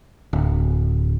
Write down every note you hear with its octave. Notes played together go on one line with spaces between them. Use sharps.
D1